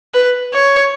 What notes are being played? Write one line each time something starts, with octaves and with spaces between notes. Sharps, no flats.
B4
C#5